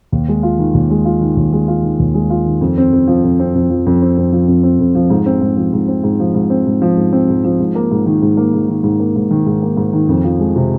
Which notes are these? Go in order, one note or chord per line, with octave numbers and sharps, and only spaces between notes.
D#2
G#3
F4
D#3
D#2
G#3
F4
D#3
D#2
G#3
F4
D#3
D#2
G#3
F4
D#3
F2
C4
F2
F3
F2
C4
F2
F3
F2
C4
F2
F3
F2
C4
F2
F3
G#2
C4
G#2
F3
G#2
C4
G#2
F3
G#2
C4
G#2
F3
G#2
C4
G#2
F3
G#2
A#3
G#2
D#3
G#2
A#3
G#2
D#3
G#2
A#3
G#2
D#3
G#2
A#3
G#2
D#3
F2
F3
G#3
C3